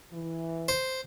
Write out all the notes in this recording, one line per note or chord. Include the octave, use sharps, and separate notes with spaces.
E3
C5